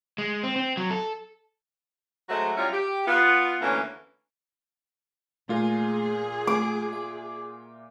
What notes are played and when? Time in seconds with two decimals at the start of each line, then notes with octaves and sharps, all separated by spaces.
0.18 G#3
0.43 C4
0.56 C4
0.77 F#3
0.90 A4
2.29 F#3 G#3 A3 F#4 C5 D#5
2.57 F#3 G3 C#4 E4 F4
2.73 G4
3.06 B3 F4
3.61 D2 E3 A3 A#3 C#4
5.49 A#2 A3 F4 G#4 A#4
6.47 A3 D6
6.93 E5